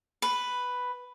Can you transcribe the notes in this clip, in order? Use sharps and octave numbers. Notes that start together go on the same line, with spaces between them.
B4